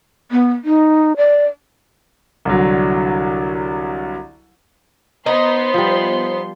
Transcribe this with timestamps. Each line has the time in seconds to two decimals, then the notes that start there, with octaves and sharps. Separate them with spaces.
0.31 B3
0.64 D#4
1.17 D5
2.45 C2 D3 F#3
5.26 B3 D#4 C5 C6
5.74 F3 G3